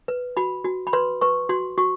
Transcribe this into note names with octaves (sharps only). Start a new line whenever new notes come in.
B4
F#4 B5
F#4
B5
B4 C6
B4 C#6
F#4 C6
F#4 C#6